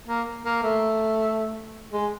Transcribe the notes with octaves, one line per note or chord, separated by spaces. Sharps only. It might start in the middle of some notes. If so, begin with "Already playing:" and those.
A#3
A#3
A3
G#3